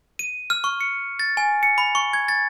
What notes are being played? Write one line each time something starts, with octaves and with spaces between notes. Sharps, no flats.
D#7
F6
C#6
C#7
A6
G#5
C#7
B5
C#6
G#6
A6